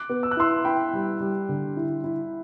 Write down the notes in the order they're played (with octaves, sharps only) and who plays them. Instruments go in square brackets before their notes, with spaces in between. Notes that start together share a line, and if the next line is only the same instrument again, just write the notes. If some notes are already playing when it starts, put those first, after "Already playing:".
Already playing: [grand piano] D6 F#6
[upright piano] B3
[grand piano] E6
F#6
[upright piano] E4 [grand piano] C6 E6
[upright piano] E4 [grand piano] G5 B5
[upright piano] G3
G3
D3
E4
E4